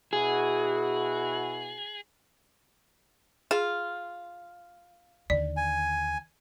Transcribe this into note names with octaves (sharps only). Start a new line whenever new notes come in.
B2 E4 F#4 G#4
F4 G#4
D#2 D3 D5
G#5